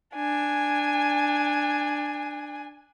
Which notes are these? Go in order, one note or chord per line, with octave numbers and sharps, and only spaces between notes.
D4 G#5